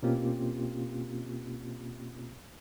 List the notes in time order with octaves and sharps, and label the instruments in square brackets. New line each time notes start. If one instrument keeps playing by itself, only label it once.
[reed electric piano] B2 A#3 C4 C#4 F4 G4